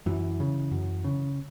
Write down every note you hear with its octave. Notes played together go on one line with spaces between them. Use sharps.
F#2 E3
C#3
F#2
C#3